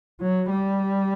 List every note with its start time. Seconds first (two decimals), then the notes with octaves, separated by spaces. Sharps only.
0.21 F#3
0.50 G3